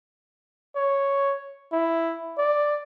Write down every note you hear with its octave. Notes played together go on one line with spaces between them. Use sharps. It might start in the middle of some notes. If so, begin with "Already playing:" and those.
C#5
E4
D5